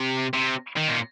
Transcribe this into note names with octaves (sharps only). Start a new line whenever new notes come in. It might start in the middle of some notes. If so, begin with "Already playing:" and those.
Already playing: C3
C3
D#3
A#2